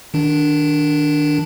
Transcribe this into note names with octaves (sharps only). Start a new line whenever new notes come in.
D#3 D4